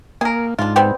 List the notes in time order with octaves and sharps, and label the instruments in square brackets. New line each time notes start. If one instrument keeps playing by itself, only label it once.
[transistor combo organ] A#3 [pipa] G#4 A#4
[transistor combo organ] G#2 [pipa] D4 F4
[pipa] G3 B3 C4